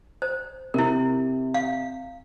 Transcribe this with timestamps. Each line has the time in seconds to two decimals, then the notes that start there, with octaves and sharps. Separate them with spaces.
0.22 C5
0.74 C3 E4 A#4
1.54 F5